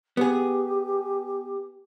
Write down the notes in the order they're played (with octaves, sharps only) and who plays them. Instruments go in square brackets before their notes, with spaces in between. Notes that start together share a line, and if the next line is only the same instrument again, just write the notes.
[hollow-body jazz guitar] B3 G#4 [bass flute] G4